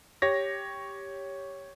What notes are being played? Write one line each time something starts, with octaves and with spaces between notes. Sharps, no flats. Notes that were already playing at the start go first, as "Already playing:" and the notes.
G4 C#5 A#6